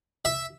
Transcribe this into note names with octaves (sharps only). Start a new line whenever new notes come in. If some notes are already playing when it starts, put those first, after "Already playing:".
E5